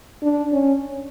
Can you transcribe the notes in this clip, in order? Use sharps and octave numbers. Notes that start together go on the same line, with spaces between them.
D4
C#4